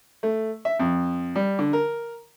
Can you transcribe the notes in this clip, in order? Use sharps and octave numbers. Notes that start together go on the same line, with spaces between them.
A3
E5
F2
G3
D3
A#4